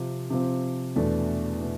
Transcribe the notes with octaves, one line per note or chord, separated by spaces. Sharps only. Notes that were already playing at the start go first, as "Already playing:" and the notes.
Already playing: C3 F3 C4
C3 F3 C4
E2 B2 A3 D4
B2